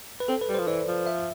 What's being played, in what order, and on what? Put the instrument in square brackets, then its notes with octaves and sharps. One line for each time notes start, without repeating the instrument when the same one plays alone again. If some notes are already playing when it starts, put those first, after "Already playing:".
[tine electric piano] B4
[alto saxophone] C4 [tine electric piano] A4
[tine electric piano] B4
[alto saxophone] G3
[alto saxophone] F3 [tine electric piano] C5
[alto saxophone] E3 [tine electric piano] D5
[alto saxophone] F3
[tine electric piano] E5